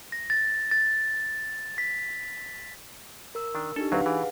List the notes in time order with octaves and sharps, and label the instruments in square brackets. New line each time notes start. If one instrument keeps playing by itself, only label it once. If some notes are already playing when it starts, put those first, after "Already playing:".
[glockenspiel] A#6
A6
A6
B6
[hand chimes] A#4 E6
[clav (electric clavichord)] D#3 D4
[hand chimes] D4 D#4 G4 [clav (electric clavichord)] A4
[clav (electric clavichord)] D2 F#3 C4 [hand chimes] B4 F5 F#5
[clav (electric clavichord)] E3 [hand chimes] G#4